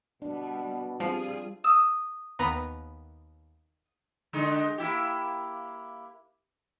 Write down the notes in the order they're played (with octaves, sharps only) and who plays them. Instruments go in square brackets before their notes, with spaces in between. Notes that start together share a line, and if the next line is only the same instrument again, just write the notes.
[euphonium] B2 [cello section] G3 B3 [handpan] D4
[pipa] F3 [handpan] G3 [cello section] C4 F4 G#4
[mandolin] D#6 [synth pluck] E6
[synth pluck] D#2 B3 A#5
[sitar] D3 G#3 D#4
A#3 E4 G4